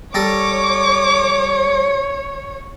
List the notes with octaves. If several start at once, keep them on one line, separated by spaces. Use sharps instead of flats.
G3 A4 A#4 C#5 D6